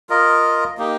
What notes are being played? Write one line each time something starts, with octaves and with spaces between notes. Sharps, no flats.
F4 A#4 D#5
A#3 D#4 G4